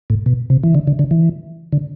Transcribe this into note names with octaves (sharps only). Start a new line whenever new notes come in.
A2
B2
C3
E3
D3
D3
D3
E3
D3